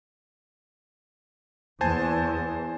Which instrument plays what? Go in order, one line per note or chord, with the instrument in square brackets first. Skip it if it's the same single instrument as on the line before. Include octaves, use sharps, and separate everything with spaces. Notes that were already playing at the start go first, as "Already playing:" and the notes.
[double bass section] E2 [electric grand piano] C5 G#5 A5